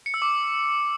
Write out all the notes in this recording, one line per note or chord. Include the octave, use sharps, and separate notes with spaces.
C#7
E6
D6